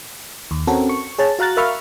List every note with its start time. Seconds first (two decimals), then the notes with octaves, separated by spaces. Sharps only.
0.51 D#2
0.67 C4 C#4 F#4 A4 A#4
0.89 C#6
1.18 G#4 C#5 A5
1.39 F#4 F5 A#5 F#6 A6
1.57 A#4 E5 F5 B5 C#6 F6